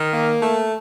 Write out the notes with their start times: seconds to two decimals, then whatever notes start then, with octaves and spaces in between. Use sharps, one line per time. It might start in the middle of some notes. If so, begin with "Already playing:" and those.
Already playing: D#3
0.12 A#3
0.41 A3